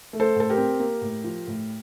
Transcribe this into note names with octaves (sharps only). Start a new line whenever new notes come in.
A3
A4 C5
A2 A4
G4 A#4
C4
A#3
A2
F3
A2